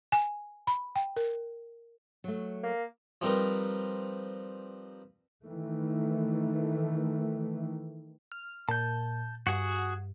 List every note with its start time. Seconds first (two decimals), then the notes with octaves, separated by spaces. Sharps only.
0.12 G#5
0.67 B5
0.96 G5
1.16 A#4
2.24 F#3 A3
2.64 A#3
3.21 F3 G3 C4 D#4 A#4 B4
5.45 D#3 E3 A3
8.32 F6
8.69 A#2 A5 G6
9.47 G2 F#4 G#4 F#5